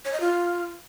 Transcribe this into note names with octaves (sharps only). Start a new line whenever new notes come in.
C#5
D#5
F4